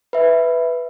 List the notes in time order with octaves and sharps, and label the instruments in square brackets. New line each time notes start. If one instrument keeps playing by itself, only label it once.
[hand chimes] B4 E5